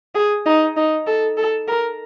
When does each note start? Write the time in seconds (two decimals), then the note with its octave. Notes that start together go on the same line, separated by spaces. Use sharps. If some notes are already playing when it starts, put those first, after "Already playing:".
0.15 G#4
0.46 D#4
0.77 D#4
1.07 A4
1.37 A4
1.68 A#4